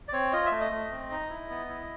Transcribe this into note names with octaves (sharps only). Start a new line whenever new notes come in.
D5
C4 C#5
F4 D#5
E5
A3
D#5
A3
C4
D#4
E4
B3
E4